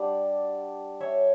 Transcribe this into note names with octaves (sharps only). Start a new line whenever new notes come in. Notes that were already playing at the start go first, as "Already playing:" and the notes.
Already playing: G3 D4 D5 F#5
C#5 E5